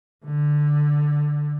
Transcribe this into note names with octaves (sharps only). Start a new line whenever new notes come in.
D3